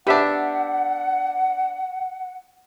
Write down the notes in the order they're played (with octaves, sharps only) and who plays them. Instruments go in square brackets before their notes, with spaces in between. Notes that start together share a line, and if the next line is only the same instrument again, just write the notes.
[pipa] B3 D4 [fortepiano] G4 E5 D6 [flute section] F#5